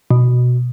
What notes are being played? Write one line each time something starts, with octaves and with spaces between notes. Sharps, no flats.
B2